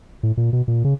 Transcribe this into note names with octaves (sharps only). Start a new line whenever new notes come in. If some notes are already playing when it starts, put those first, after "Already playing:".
A2
A#2
B2
A#2
C#3